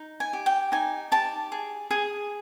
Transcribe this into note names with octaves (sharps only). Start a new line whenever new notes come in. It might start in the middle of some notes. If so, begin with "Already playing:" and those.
Already playing: D#4
G#5
G4
G5
D#4 G#5
G4 A5
G#4
G#4